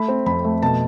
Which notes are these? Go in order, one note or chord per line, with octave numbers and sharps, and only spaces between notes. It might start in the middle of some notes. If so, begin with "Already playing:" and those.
Already playing: A3 B5
C4
F2 B5
A3
B2 A5